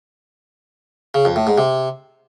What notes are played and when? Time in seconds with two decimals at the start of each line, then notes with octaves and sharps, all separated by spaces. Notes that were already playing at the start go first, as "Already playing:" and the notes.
1.14 C#3
1.25 F2
1.36 A2
1.47 G#2
1.58 C3